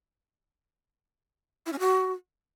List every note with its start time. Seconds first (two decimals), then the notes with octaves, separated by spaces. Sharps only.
1.66 E4
1.73 C#4
1.79 F#4